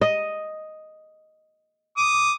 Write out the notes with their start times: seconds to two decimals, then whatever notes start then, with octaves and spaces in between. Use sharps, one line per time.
0.01 D#5
1.97 D6 D#6